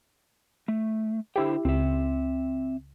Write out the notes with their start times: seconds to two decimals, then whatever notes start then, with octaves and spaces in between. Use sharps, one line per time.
0.68 A3
1.36 D3 E4 G4 C5 G5
1.65 C#2 C4 E5